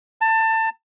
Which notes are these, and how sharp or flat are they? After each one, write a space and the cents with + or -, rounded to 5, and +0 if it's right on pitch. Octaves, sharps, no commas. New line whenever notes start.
A5 +25